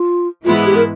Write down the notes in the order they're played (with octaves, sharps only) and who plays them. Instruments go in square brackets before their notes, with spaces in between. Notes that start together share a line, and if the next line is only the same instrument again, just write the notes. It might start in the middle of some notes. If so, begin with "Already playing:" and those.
Already playing: [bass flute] F4
[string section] G#2 E3 G#3 B3 E4 [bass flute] F4
[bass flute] G4
A#4